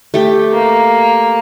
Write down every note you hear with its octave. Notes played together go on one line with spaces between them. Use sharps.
A3 G4
A#3